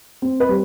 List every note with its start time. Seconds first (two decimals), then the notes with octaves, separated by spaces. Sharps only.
0.22 C4
0.40 B4
0.49 G3